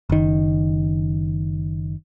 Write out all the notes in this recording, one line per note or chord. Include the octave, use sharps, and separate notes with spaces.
F#1 D#3